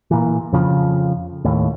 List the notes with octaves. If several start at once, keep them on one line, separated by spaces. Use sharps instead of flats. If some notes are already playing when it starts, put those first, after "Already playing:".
A#2 E3
F2 C#3 F3
D#2 A2